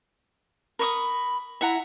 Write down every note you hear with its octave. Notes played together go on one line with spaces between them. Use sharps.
A#4 B5 C#6 D#6
E4 E5 F#5 A#5